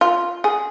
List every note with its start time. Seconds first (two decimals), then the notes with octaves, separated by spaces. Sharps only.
0.01 F4
0.44 G#4